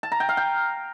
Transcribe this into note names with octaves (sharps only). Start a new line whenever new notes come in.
A5
A#5
G5
F5
G5